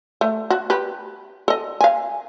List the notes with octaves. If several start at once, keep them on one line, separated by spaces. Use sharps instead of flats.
A3
F#4
G4 B4
A4 D#5
F5 G#5